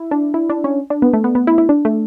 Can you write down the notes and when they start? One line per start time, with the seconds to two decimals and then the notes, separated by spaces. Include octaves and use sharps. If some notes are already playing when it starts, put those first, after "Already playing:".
Already playing: E4
0.11 D4
0.34 E4
0.50 D4
0.64 C#4
0.90 D4
1.02 B3
1.13 A3
1.24 B3
1.35 B3
1.47 E4
1.58 E4
1.69 D4
1.85 A3